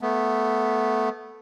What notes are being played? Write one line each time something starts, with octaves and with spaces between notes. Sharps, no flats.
A3 B3